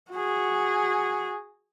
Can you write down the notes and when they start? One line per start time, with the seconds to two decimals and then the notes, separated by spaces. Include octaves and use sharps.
0.11 F#4 G#4